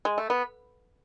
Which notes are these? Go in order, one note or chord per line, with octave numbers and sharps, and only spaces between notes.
G#3
A3
B3